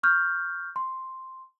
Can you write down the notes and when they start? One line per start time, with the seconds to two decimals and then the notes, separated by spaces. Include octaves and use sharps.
0.03 C#6 F6 G6
0.76 C6